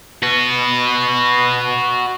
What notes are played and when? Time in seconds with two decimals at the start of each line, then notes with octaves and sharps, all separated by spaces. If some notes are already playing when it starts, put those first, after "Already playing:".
0.23 F#4 B4